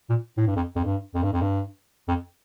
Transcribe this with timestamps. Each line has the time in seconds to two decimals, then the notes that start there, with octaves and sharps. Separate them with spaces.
0.09 A#2
0.37 A2
0.47 G2
0.56 F2
0.76 F2
0.85 G2
1.14 F2
1.23 G2
1.33 F2
1.41 G2
2.08 F2